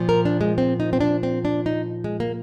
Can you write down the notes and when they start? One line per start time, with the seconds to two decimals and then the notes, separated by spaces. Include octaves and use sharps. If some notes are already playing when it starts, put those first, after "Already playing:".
Already playing: A#2 F3
0.09 A#4
0.25 D4
0.41 G#3
0.58 C4
0.80 D#4
0.93 C4
1.01 D4
1.23 C4
1.45 D4
1.66 D#4
2.04 G#3
2.20 A#3